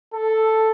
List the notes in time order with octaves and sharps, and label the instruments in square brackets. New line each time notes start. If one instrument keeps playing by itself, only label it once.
[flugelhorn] A4